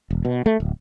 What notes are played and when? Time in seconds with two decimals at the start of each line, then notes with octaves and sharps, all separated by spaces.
0.11 E1
0.25 B2
0.46 A3
0.60 D1